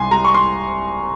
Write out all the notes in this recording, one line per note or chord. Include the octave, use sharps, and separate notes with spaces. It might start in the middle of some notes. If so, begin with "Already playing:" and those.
Already playing: C2 G#5 C6
G3 A#5
C#6
C6